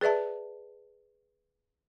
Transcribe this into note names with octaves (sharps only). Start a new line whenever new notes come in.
G#4 B4 D5 E5 A5